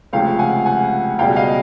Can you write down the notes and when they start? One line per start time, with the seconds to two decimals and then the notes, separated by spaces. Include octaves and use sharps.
0.13 C#2 C3 F3 A3 F5 G5
0.39 F#5 G#5
0.66 F#5 G#5
1.19 C#2 B2 G3 F5 G5
1.36 D#5 F5